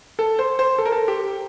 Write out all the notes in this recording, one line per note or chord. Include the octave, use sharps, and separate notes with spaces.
A4
C5
C5
A4
A#4
A4
G4